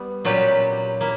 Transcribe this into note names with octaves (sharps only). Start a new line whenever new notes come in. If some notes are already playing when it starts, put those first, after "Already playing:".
Already playing: G3 B3
A#2 F#3 C#4 G4 B4
A#3 E4